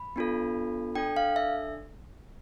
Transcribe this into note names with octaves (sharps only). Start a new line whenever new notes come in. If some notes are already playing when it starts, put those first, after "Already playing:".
Already playing: B5
B3 D4 F4 A4
D4 A4 G5
F5
E5